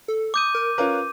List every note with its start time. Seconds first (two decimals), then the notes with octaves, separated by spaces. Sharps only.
0.08 A4
0.34 D6 D#6 G6 D#7
0.55 A#4
0.78 C#4 F4 A#4 B4